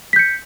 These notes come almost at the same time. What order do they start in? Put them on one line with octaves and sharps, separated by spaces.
B6 G6 C#7